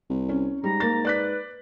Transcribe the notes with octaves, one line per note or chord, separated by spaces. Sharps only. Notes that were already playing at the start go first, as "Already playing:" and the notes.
C2
C#4
G#2 G3 A#5
A#3 A6
B4 D5 F#6 B6